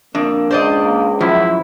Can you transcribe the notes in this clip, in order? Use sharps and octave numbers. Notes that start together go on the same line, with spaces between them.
F2 A#3 D4
C#2 C5 D5 D#5
A#3
F#2 F3 E4